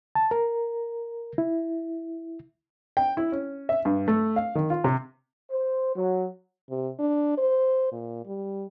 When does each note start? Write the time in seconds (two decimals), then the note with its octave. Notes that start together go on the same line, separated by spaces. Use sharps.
0.15 A5
0.31 A#4
1.38 E4
2.97 G5
3.17 E4
3.32 C#4
3.69 E5
3.85 G2
4.08 A3
4.36 F5
4.55 D#3
4.70 F4
4.84 C3
5.51 C5
5.95 F#3
6.70 C3
6.99 D4
7.38 C5
7.92 A#2
8.26 G3